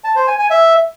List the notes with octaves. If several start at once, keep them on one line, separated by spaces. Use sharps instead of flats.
A5
C5
G#5
G#5
E5